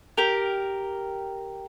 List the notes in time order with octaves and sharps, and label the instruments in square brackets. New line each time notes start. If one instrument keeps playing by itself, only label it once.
[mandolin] G4 A#4